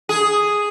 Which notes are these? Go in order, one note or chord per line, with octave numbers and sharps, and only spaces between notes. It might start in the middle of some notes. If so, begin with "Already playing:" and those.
G#4